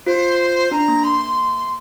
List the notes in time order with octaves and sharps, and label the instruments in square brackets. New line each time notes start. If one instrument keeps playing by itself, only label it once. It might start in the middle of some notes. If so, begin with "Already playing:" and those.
[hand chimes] F4 [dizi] C5
[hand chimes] D4 [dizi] A#5
[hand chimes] A#3
[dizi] C6